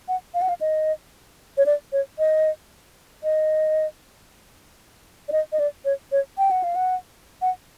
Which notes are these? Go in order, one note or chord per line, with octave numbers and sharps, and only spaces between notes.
F#5
F5
F#5
F5
D#5
C#5
D5
C#5
D#5
D#5
D5
D#5
D#5
D5
C#5
C#5
G5
F#5
F5
F#5
F#5